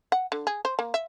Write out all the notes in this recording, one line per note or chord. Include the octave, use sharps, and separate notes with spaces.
F#5
D3
G#4
C5
A#3
E5